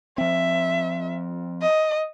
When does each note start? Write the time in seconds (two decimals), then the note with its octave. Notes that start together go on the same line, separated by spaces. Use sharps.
0.18 F3 C4 E5
1.62 D#5